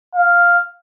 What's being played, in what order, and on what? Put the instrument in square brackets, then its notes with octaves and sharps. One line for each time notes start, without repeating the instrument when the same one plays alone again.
[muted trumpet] F5